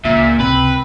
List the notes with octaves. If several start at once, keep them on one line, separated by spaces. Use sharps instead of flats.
C#2 A#2 E5
C#2 C3 C4 B4